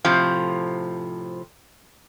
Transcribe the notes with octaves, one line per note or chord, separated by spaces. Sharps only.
A2 C3 F3